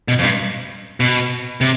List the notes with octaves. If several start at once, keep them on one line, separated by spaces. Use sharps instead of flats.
B2
F2
G2
B2
C3